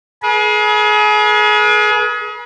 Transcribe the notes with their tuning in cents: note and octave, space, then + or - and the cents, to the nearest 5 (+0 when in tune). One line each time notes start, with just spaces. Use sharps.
G#4 +30 B4 -45